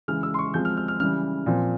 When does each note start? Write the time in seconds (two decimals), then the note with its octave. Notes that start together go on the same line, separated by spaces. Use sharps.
0.08 C#3 E3 G#3 F6
0.23 E6
0.34 C6
0.39 C#6
0.54 F3 G#3 C4 G6
0.65 F6
0.77 F6
0.88 F6
1.00 C#3 E3 G3 F6
1.46 A#2 F3 C4